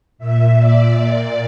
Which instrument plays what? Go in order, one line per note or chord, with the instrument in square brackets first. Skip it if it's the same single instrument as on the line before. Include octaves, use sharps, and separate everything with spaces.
[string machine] A#2 E5
D5
A#2